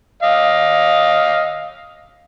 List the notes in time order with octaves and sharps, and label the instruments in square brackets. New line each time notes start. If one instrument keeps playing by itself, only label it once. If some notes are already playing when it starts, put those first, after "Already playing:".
[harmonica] D#5 F5